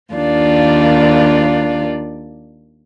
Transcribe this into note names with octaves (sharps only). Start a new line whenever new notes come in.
D#2 D#3 D4 F4 D5